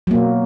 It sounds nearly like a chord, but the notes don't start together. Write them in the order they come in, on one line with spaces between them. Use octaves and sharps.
F#3 A#3 B2